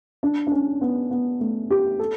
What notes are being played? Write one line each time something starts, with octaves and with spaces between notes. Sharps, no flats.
D4
D4
C#4
B3
B3
A3
G4
A4